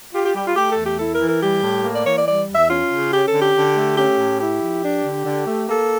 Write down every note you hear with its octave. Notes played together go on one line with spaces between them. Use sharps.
F4 G4
G4
G3 G4
F4
A3 G4
A4
E2
G4
E4 A4
A#4
E3
A#4
G3 G4
A2
A#3
D5
E3 C#5
D5
G3 D5
E2
E5
C#4 F4
C#3
C#4 G4
A4
D3
G4
D3
A3
C#4 G4
A2
E4 G4
F3
D4
D3
D3
A3
A#3 A4